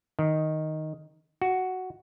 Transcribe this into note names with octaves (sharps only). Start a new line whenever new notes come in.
D#3
F#4